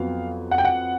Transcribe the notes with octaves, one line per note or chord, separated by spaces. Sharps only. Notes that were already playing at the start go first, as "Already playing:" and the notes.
Already playing: F2 F#3 B3 F5
F#5
G5
F#5